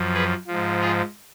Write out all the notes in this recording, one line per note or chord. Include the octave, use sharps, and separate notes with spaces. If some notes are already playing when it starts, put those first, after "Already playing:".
Already playing: F#2 F3
G#4 B4
G#2 F3
F4 G#4